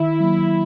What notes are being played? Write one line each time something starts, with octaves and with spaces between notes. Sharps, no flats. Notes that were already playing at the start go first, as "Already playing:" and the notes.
Already playing: D#3 E4
F#3 A#3